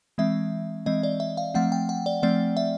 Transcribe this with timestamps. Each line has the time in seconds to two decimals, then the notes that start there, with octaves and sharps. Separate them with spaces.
0.18 E3 G#3 C4 E5
0.86 E3 G#3 C4 D#5
1.03 D5
1.20 E5
1.37 F5
1.54 F3 A3 C4 F#5
1.72 G5
1.89 F#5
2.06 D5
2.23 F3 A3 C4 D5
2.57 E5